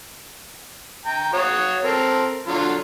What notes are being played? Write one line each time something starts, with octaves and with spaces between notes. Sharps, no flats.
G5 A#5
F#4 C#5 D#6
C4 A4 A#4
D3 F#3 F4